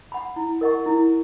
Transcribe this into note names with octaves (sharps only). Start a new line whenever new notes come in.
F#5 B5
E4
A#4 D#5 F#5 C#6
E4